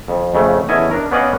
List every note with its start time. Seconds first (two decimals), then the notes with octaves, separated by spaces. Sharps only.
0.08 F2
0.34 F2 C#3 A3
0.69 E2 C#4 E4 A4 D#5 G#5
0.91 D4 A#4
1.11 B3 C#4 D5 D#5 F5 F#5